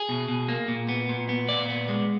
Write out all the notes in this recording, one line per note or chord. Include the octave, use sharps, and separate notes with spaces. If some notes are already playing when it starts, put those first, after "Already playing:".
Already playing: G#4
B2
B2
A#3
A#2
B3
A#2
B3
A#2 D5
B3
G#3